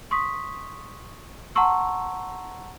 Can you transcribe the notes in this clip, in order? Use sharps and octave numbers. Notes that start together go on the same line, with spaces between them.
C6 C#6 D#6 B6
F#5 A5 A#5 C6 C#6 E6